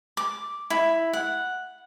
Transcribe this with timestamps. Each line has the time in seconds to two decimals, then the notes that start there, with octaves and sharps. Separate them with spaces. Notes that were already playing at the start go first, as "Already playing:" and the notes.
0.17 D6
0.70 E4
1.13 F#5